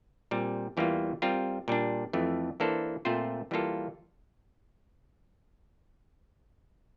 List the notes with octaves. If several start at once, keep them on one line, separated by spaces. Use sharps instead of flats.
A#2 G3 C4
E2 E3 G3 A#3 F4
G3 C4 F4 A#4
A#2 G3 D4
F2 E3 A3
E3 A#3 D4 A4 C5
A#2 A3 C4 F4 C5
E3 G3 A#3 F4 A4